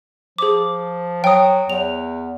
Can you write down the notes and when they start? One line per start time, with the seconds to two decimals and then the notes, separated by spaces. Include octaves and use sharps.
0.38 F3 G#4 D6
1.24 F#3 G5 D#6
1.70 E2 F7